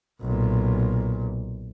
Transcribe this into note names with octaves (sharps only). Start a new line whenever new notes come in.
B1 A#2